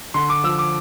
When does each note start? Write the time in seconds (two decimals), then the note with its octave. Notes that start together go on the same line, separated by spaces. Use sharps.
0.14 D3 C6
0.29 D6
0.44 F3 E6
0.59 D6